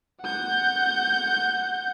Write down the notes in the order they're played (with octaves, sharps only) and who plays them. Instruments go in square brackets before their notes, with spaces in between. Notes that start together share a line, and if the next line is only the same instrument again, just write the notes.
[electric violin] F#5 G6